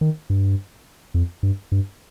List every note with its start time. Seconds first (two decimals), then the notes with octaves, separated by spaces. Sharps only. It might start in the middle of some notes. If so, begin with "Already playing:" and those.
0.01 D#3
0.30 G2
1.14 F2
1.43 G2
1.72 G2